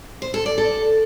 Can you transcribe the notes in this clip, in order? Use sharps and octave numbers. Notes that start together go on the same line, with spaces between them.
C5
A4
D5
A4